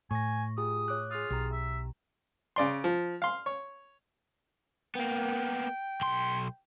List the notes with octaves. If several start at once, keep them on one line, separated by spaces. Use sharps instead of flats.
A2 G#5 C#6 A#6
F4 G4 G#4 D#6
C#5 D6 F#6
F4 G#4 D#6
B1 G4 A#5
E5
C#3 D5 C6
F3
F5 C6
C#5
A#3 B3 G5
B1 C6